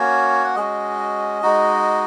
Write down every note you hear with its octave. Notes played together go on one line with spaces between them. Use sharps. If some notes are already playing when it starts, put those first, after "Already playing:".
Already playing: A#3 C#4 F#4 C#5
F#5
G#3 C#4 F#4 D#5
G#3 D#4 F#4